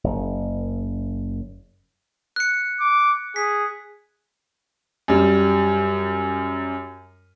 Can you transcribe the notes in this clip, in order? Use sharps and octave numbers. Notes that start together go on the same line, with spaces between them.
F#1
F#6 C#7
D6
G#4 B6
F#2 G3